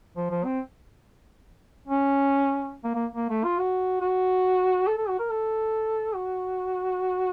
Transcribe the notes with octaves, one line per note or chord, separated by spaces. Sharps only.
F3
F3
C4
C#4
A#3
A#3
A#3
A3
F4
F#4
F#4
A4
A4
F#4
A#4
A4
F#4